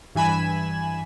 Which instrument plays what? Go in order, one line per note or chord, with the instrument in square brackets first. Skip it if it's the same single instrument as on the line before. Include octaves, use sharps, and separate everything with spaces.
[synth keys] G2 E3 G#5 B5 E7